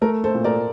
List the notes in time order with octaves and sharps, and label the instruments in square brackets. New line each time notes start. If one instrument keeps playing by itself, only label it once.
[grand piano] A3 [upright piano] A#4
[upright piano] A4 C5
[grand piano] A#2
[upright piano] A#4 D5